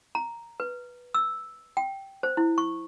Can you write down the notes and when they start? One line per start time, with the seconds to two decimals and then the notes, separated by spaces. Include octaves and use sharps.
0.15 A#5
0.60 B4
1.14 E6
1.77 G5
2.23 C5
2.37 E4
2.58 C#6